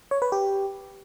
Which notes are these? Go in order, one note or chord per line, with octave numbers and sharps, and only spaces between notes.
C#5
B4
G4